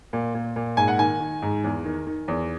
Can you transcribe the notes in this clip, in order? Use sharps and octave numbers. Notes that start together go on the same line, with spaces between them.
A#2
A#2
A#2
G#2 G#5
F#5
D#3 G#5
D#3
G#2
E2
D#3
D#3
E2